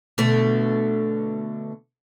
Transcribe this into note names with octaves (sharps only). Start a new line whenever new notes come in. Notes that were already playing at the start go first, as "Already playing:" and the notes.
B2 D3 A3